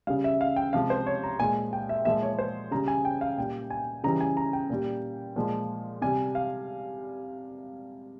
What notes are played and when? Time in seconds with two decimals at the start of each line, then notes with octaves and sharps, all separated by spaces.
0.07 C#3 G3 F5
0.24 E5
0.41 F5
0.56 G5
0.73 C3 F3 G#3 F5
0.90 C5
1.07 C#5
1.24 A#5
1.39 A#2 G#5
1.42 G#3
1.73 G5
1.89 E5
2.05 A#2 F3 G#3 E5
2.23 C#5
2.39 C5
2.71 C#3 G3 A#5
2.88 G#5
3.05 G5
3.21 F5
3.38 A#2 G3 G5
3.70 G#5
4.04 C#3 E3 G3 A#5
4.21 G#5
4.37 A#5
4.53 G5
4.70 A#2 G3
5.36 A#2 F3 G#3
6.02 C3 G3 G#5
6.35 F5